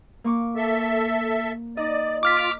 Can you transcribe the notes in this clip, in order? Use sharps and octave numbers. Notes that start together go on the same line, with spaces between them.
A#3 C#6 D6
A4 E5
D#4 D5 D#5
F4 D6 F6 B6